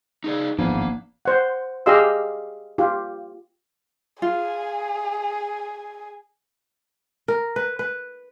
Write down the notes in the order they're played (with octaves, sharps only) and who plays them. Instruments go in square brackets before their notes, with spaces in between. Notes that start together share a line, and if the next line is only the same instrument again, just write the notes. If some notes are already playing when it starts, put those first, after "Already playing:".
[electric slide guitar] D#4 G#4 D5
[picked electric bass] D1 B3 D4 [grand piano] G#1 E3 [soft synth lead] F3 [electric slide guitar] A#3
[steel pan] C5 F#5
G4 G#4 D#5 F5 C6 E6
F4 G4
[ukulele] F4 [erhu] G#4
[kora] A#4
B4
B4